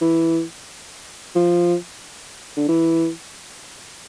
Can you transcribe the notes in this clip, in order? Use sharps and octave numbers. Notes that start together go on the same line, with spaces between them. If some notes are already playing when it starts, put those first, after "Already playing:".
E3
F3
D3
E3